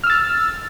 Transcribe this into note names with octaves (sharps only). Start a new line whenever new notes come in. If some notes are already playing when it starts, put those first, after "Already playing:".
E6 F6 A6